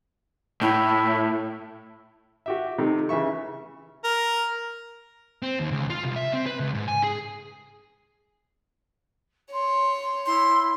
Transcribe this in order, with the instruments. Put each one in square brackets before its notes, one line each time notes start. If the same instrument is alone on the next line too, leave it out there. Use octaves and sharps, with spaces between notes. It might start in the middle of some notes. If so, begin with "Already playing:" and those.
[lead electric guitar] A2 [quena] E4
[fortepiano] F#4 G4 E5
C3 D#3 A3
C#3 E3 E5 C#6
[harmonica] A#4
[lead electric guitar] C4
D#2
C#2
F4
C2
E5
C4
B4
C#2
G#2
G#5
G#4
[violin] C#5 [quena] C6
[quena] E4 [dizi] C6